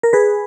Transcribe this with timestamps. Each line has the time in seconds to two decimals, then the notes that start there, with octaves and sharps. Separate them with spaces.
0.03 A#4
0.13 G#4 B4